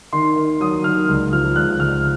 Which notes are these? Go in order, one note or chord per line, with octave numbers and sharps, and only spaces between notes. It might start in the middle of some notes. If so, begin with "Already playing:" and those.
D#3 C6
D#3
F#3 D#6
D#3 F6
C#2
F3 F6
C#2 F#6
C#2 F6